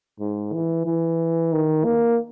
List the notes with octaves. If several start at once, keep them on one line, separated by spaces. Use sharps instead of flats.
G#2
E3
E3
D#3
A#3